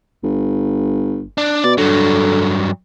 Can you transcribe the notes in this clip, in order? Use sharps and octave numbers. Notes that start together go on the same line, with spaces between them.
G1
D4
B2 D5
G2 D3 F#3